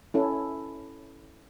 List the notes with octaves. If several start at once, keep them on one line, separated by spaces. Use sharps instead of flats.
C#4 E4 A4